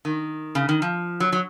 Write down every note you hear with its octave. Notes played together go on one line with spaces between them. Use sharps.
D#3
C#3
D#3
F3
F#3
F#3